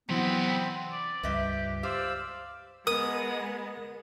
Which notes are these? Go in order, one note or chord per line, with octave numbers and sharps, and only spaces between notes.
C3 E3 F#3 B3 C4 B4
D5
C#2 G2 G3 G4 B4 D#5 E5
G4 C5 D5 F5 E6
G#3 B3 A#4 D#6